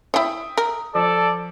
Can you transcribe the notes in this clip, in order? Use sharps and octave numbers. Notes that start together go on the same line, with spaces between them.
E4 C#5 E5 G5 D#6
A#4
F3 A4 D5 A5